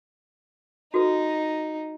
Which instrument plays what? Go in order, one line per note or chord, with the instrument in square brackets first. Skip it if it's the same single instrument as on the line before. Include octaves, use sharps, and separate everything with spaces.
[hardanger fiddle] D#4 [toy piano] F#4 A4 B4